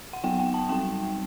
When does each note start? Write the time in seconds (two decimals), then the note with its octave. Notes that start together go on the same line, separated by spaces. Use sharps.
0.13 F#5
0.24 F#3 B3 D#4 G5
0.39 G5
0.54 A5
0.69 G3 C4 D#4 G5